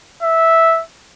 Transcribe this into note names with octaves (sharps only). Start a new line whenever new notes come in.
E5